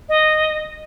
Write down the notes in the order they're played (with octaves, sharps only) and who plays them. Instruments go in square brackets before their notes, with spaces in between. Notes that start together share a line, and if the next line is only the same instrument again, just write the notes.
[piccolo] D#5